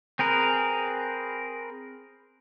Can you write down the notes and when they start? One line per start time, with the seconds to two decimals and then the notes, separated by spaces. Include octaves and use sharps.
0.19 C4 G#4 A#4 B4